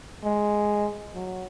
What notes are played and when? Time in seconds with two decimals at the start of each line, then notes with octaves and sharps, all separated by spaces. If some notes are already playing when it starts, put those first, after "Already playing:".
0.24 G#3
1.14 F#3